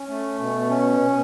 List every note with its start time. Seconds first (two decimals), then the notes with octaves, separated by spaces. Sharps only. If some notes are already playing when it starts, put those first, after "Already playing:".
Already playing: C#4
0.09 A3
0.39 B2
0.69 C#4
1.00 B2